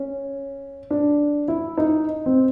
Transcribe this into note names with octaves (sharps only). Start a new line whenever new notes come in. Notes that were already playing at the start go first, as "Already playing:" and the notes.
Already playing: C#4
D4
E4
D#4
C4